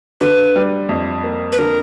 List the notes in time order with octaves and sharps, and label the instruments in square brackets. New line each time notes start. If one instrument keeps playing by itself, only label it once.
[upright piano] D3 [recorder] B4
[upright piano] G3
F2
A#3
[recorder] B4
[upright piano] D3 [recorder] A#4